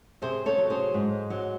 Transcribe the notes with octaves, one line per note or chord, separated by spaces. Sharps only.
C3 G#4 C5
A4 C#5
F#3
G#4 C5
G#2
F#3